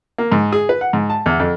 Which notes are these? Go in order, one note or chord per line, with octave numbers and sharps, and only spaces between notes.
A#3
G#2
G#4
B4
F#5
G#2
A5
E2
F2